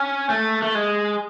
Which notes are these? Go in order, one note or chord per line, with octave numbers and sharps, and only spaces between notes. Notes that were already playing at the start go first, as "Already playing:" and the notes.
Already playing: C#4
A3
A3
G#3